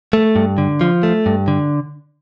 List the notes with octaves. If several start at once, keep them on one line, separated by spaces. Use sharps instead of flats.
A3
G2
D3
F3
A3
G2
D3